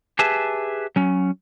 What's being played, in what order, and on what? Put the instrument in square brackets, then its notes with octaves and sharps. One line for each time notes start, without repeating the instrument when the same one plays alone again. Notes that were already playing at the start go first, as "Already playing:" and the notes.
[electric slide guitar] G4 G#4 B4 E5 A5
F#3 C#4